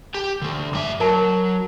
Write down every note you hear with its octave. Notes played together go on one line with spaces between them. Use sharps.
G4 G5
D3 A3
G2 G#4 E5 D6
F#3 A#4 A5